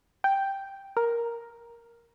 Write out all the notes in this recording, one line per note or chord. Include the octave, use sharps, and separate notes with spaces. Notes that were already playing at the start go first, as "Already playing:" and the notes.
G5
A#4